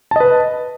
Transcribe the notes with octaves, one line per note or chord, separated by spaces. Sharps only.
B4 D#5 A5